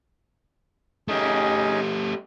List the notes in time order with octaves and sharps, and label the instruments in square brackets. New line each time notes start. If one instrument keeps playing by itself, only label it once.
[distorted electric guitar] A3 G4 [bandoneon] C#4 D#4 G#4